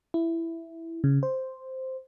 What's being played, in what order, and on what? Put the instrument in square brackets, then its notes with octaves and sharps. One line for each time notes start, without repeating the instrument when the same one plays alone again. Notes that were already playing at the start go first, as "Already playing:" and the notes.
[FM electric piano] E4
C#3
C5